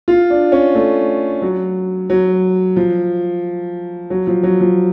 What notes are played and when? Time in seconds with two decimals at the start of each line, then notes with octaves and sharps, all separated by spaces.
0.08 F4
0.30 D4
0.52 C#4
0.75 A3
1.42 F#3
2.10 F#3
2.76 F3
4.10 F#3
4.27 F3
4.43 F#3
4.61 F3